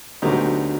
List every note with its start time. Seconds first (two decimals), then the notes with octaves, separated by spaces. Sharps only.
0.22 D2 D3 F#3 B3 D#4 G4